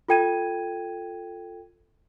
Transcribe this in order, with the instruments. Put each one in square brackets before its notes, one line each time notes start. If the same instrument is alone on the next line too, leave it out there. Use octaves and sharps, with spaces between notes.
[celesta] F4 A4 G5 G#6 D#7